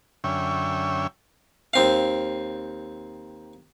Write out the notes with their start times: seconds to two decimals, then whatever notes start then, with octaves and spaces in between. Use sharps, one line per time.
0.24 F#2 D3 C#4 E5 G5 C#6
1.73 D#2 C4 F5